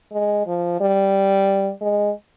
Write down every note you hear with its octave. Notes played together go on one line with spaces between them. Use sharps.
G#3
F3
G3
G#3